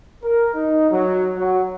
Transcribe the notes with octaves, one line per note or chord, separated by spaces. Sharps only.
A#4
D#4
F#3
F#3